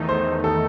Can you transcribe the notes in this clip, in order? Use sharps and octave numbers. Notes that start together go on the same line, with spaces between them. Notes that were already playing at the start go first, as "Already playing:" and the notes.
Already playing: E2 D#3 A3 D#4
C5
A4